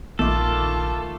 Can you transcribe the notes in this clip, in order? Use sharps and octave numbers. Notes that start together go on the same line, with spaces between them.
A#1 D#3 A3 F4 A4 A#4 D6